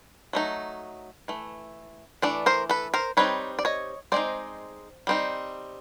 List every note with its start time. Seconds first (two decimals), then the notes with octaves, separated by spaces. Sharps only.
0.33 F#3 A3 D#4
1.28 E3 A3
2.22 E3 A3 D4 D5
2.46 A#4 C5
2.69 A4 B4
2.94 A#4 C5
3.17 G3 C4 D#4 B4 C#5
3.59 D5
3.65 C#5 D#5
4.12 G#3 C4 D#4 C5 D5
5.07 G3 C4 D#4